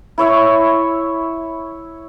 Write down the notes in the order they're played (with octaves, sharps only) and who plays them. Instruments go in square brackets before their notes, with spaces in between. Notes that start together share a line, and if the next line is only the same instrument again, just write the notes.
[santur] E4 C#5 E5 C#6